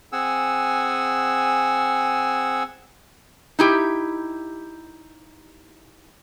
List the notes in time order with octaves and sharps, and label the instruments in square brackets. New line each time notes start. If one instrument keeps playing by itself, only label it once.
[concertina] C4 G#4 F#5 G#5 E6
[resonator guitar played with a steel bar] D#4 E4 G4